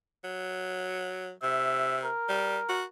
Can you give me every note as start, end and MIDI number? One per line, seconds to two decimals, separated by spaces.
0.24 1.32 54
1.43 2.08 48
1.43 1.97 76
2.04 2.85 70
2.29 2.58 55
2.69 2.84 66